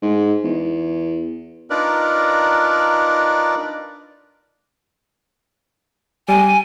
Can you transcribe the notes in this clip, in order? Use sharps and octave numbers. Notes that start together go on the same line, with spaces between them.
G#2
E2
D4 D#4 F4 A#4 B4 D5
G3 G#5